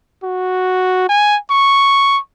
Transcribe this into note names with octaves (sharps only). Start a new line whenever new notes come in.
F#4
G#5
C#6